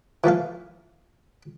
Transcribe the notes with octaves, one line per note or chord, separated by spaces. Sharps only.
E3 F3 A3 F5